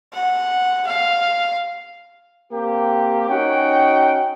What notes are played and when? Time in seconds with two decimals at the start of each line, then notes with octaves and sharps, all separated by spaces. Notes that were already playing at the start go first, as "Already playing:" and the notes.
0.14 F#5
0.87 F5
2.53 A#3 C4 G4
3.30 C#4 D#4 F#4 F#5 G5